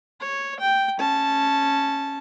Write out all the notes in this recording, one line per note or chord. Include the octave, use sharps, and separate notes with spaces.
C#5
G5
C#4 A5